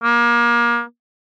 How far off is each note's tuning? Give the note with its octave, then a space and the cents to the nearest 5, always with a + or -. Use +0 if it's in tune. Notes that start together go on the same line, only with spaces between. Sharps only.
A#3 +30